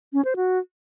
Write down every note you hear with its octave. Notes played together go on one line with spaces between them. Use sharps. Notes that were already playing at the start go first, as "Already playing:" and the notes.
C#4
C5
F#4